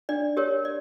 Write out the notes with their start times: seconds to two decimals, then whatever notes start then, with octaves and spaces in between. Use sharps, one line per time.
0.09 D4 D5
0.37 G4 A#4 C#5
0.65 D5